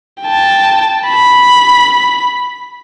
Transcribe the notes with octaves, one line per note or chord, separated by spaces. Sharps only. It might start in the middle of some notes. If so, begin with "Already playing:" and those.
G5 A5
B5